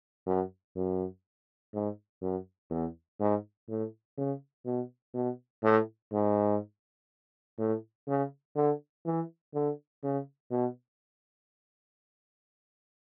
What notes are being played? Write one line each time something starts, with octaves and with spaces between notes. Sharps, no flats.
F#2
F#2
G#2
F#2
E2
G#2
A2
C#3
B2
B2
A2
G#2
A2
C#3
D3
E3
D3
C#3
B2